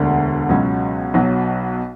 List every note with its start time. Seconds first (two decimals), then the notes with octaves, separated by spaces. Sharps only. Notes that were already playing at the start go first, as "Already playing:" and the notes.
Already playing: E1 D2 D3
0.49 C#2 B2 F#3 C#4
1.14 B1 B2 F#3